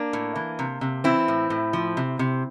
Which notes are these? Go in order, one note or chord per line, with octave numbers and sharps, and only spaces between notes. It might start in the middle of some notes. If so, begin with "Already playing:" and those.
Already playing: A#3 D4
A2
E3
C3
C3
E3 C4 E4
A2
A2
F3
C3
C3